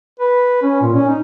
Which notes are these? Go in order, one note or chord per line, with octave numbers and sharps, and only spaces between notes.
B4
C#4
A#2
C#4
D#4